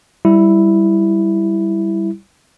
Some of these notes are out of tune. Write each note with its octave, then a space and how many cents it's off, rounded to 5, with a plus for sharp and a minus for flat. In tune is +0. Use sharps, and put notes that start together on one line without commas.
G3 +0 E4 +0